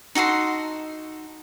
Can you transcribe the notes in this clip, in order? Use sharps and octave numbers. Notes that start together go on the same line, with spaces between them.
D#4 F#4 A4 C6